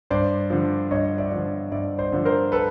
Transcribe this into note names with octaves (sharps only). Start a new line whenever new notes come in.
G2 C5 D5
D3 F3
G2 C#5 D#5
D5 E5
D3 F3
G2 D5 E5
C5 D5
D3 F3
A#4 C5
A4 B4